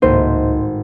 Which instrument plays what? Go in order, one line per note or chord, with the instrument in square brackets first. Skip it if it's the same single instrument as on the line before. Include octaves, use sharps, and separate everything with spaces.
[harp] G#1 A2 [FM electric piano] C#2 A#3 D#4 [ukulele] C5